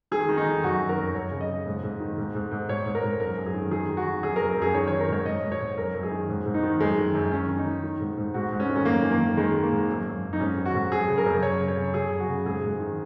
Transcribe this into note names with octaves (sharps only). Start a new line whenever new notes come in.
D#3 G#4
D#3
D#4
D#3
F#2 F#4
D#3
A#4
F#2
F#2 C#5
C#3
D#5
C#3
G#2
G#2
D#3
G#2
G#2
G#2
G#2 C#5
G#2
A#4
G#2
F#2 A#4
F#2
G#4
D#3
D#3 G#4
D#3
F#4
D#3
F#2 G#4
F#2 A#4
A#4
F#2 G#4
D#3 C#5
C#5
D#3
A#4
G#2 C#5
G#2 D#5
G#2
C#5
G#2
F#2 A#4
F#2
G#4
D#3
G#2
G#2
D#4
D#3
F#2 G#3
D#3
F#2
D#3 C#4
D#3
D#4
D#3
D#3
G#2
G#2
G#2 F#4
G#2
C#4
D#3
C#4
F#2 A#3
D#3
A#3
D#3
D#3 G#3
D#3
A#3
G#2
F#2
F#2
F#2
D#4
G#2 C#4
D#3
F#4
G#2
F#2 G#4
C#3
A#4
F#2
C#3 C#5
C#3
C#5
C#3
C#3 G#4
F#2
F#4
C#3
G#2 G#4
G#2
D#3